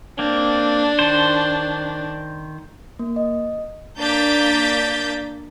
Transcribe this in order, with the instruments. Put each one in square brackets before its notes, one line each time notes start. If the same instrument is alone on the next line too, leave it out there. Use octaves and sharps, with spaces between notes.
[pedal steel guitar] A#3 C4 [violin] D4
[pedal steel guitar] D#3 C5
[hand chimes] A#3
D#5
[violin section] A#3 D4 G6 A6 B6